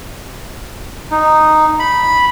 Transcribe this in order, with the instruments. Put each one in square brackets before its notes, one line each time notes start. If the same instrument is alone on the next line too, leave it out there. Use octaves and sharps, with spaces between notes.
[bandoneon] D#4
B5